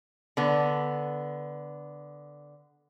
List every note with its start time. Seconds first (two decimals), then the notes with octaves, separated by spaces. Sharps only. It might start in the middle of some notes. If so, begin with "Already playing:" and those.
0.37 D3 B3